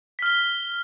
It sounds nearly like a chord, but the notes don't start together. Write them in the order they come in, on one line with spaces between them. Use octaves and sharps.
B6 F6 G7